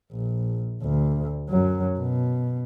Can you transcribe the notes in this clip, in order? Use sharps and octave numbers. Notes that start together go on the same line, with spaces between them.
A#1
D2
F#2 F#3
B2